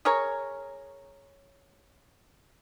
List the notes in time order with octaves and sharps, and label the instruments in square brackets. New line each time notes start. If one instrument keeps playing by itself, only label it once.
[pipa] G#4 A#4 C#5